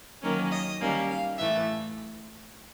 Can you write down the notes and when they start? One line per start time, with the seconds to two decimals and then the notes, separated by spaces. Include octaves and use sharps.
0.23 D#3 F#3 A#3 C#4 A#4
0.51 D#5
0.80 D#3 G3 A#3 C#4
1.09 F5
1.38 A2 E3 A3 E5